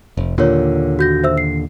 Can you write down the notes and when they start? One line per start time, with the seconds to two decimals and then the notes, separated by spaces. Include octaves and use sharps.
0.17 F1
0.38 D#2 A#2 D3 F4 A#4 C#5
0.99 F#4 G6 A#6
1.24 C5 E5 E6
1.38 C7